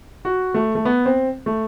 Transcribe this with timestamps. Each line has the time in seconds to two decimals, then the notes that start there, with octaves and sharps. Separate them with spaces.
0.25 F#4
0.54 A3
0.75 A3
0.85 B3
1.06 C4
1.46 A3